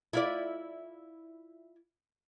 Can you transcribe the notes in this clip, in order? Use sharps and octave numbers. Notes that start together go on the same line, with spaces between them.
E4 F4 D5